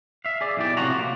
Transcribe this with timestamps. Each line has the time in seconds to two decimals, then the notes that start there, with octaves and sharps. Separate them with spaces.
0.25 E5 F5
0.41 G#4 D5
0.57 B1 E4 G4 D5
0.77 A2 C3 F3 F#4 A#5
0.99 A#3